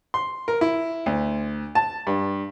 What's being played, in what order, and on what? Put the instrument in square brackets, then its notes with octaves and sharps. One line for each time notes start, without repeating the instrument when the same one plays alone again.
[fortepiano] C6
A#4
E4
D2
A5
G2